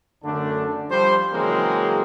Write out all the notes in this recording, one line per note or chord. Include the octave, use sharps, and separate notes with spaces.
F#2 D3 A3 D4
F3 G3 C5
C#3 E3 F#3 G#3 A#3 C4